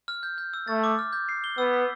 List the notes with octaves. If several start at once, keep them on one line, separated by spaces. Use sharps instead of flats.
F6
G6
G6
E6
A3 A6
D6
F6
G6
C7
G7
B3 E6
B6